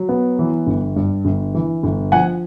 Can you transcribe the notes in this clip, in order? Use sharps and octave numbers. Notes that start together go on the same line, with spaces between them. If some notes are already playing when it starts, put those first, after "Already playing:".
Already playing: F#3
B3
E3
G1
G2
G1
E3
G1
F3 F#5 G#5